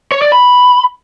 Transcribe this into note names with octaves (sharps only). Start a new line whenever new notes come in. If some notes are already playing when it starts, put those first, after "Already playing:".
C#5
D5
B5